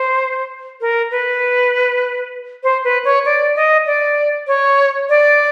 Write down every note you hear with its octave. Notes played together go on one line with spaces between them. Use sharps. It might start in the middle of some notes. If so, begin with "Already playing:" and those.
Already playing: C5
A#4
B4
C5
B4
C#5
D5
D#5
D5
C#5
D5